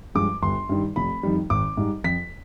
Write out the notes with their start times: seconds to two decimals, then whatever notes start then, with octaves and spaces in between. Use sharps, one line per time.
0.15 G2 F3 G#3 D6
0.42 G1 C6
0.69 G2 D#3 G3
0.96 F1 B5
1.23 F2 D#3 G3
1.50 G#1 D6
1.77 G#2 G3
2.04 F2 B6